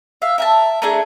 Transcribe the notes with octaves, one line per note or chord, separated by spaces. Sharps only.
E5 F5
A#4 E5 G5 A5
A3 D4 G#4 A#5